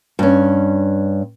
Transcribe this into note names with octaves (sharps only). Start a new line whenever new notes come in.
G2 C#4